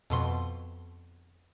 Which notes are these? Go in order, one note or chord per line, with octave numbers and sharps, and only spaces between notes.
F2 B2 C6